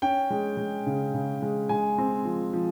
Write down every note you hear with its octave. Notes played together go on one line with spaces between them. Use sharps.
C#4 G5
G#3
G#3
C#3
C#3
G#3
G#3 G#5
C4
F3
F3